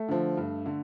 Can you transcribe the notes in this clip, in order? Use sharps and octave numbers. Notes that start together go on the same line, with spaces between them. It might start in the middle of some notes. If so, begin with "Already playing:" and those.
Already playing: A3
D3 F3
G2
D3